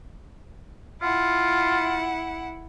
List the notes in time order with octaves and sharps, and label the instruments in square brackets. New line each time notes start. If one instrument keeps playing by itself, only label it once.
[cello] E4 F#5 [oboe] F4